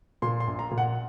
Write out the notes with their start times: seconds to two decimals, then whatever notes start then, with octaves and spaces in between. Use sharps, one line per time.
0.22 A#2 C6
0.40 C6
0.48 A#1
0.59 A#5
0.71 A#2
0.78 F#5